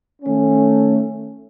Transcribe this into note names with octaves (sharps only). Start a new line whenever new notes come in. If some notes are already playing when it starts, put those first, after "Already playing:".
D#3 A3 C#4